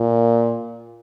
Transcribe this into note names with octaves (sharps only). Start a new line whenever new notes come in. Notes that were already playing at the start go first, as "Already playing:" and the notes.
Already playing: A#2